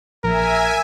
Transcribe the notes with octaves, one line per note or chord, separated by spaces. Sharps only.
A#1 A#4 E5 G#5